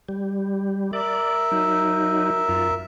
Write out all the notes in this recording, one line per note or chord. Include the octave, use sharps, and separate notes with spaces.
G3
A#4 D5 E5
F#3 D#4
F#2 F4